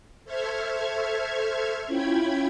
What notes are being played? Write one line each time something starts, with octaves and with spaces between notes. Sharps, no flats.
A4 C5 E5 C#6 F6 G#6
C#4 E4 F4 G5 B5 G#6